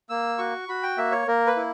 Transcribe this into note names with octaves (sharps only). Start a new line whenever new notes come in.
A#3 E6
F#4 C#6
F#4 B5
G5
A#3 E5
C#5
A#3 A#4
B4
E4